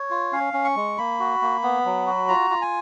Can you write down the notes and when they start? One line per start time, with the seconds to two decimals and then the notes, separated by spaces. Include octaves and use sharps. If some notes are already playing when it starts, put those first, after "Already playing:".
Already playing: C#5
0.10 F4
0.33 C#4 F5
0.54 C#4
0.64 C#6
0.76 G#3
0.98 A#3 B5
1.20 F#4
1.42 A#3
1.63 B3
1.85 F#3
2.07 F#4
2.28 F4 A#5
2.51 F4
2.62 G#5